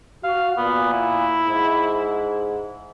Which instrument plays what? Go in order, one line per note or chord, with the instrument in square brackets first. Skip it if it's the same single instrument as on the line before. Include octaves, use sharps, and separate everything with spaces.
[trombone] F#4 [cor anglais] F5
[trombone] A#2 [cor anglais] B3
[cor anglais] E4
[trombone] G#2